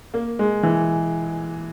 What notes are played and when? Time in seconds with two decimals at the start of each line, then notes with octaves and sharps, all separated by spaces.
0.14 A#3
0.39 G#3
0.63 E3